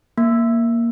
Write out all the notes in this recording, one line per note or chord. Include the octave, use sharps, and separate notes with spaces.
A#3